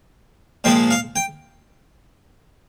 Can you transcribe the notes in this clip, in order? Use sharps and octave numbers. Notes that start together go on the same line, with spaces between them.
A#2 F3 G#3 G5
F5
G5